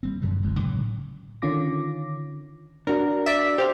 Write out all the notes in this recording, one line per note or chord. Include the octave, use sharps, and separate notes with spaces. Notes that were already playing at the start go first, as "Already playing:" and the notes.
G3 G#3 C4
F#2 D3 F#3 G3
E1 A1 E2 G#3
A2 C#3 F#3
D3 D#3 C#4 F4 D6 A#6
D4 F#4 A#4
D5 E5
G4 C5 F5